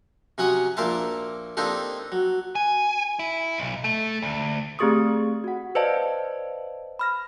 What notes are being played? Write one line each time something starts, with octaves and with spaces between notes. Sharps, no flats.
C3 F#3 C#4 F#5 C#6 D#6
A#1 A#3 A#4 C5 E5 A5
A#3 C4 D4 D#4 G4 A4
F#3
G#5
E4
B1
A3
D2
A3 C4 G4 G#4 C#6 D#6
F#4 F#5
B4 C5 D5 D#5 F5 A5
B5 F6 A#6